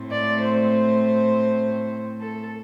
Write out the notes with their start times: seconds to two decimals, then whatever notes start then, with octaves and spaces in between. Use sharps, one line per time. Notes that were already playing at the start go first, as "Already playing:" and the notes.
Already playing: A2 A3 C4
0.11 D5
0.41 C5
2.20 A4